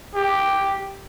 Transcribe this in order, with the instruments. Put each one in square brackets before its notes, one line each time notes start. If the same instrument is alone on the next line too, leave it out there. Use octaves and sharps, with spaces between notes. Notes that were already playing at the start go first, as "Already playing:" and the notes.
[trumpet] G4